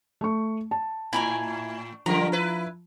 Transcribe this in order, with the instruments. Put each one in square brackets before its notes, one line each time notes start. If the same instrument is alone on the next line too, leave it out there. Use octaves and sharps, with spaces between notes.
[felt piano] A3 C#6
A5
[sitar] A2 [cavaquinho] E4 G#5 A#5
[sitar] F#2 D3 A#4 [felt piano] F3 [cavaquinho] A#5
[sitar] E4 B4